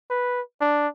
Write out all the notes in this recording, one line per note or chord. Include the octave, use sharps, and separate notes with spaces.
B4
D4